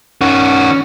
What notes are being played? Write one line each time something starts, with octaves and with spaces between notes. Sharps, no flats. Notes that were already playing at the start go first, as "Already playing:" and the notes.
D#3 C#4 F#4